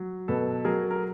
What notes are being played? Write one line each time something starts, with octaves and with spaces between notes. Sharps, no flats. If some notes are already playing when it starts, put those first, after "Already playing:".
Already playing: F#3
B2 A4 B4
F#3 G#4 A#4
A#4